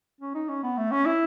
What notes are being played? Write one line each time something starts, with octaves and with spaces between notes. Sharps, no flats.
C#4
D#4
C#4
B3
A3
C#4
E4